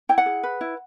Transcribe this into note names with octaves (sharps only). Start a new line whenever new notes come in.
E4 G5
F#5
G#4
B4
E4